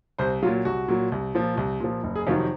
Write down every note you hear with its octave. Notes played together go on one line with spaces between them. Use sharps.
C2 C5
A#2 F#3 F4
C2 F#4
A#2 F#3
C2
A#2 F3
C2
A#2 F3
F#1
G#4
F2 C3 D#3 F#3 F4
D#4